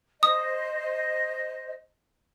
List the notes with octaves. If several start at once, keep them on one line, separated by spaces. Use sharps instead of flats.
C5 D#5 D#6